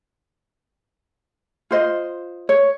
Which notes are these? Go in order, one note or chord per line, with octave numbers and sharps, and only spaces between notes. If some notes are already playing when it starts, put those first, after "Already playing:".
F4 C5 D#5
C#5